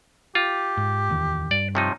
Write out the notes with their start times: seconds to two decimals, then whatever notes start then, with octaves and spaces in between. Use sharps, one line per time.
0.35 F4 G4
0.77 G#2
1.09 D1 E2 D#3
1.51 G2 D5
1.75 C3 F3 D#4 C#5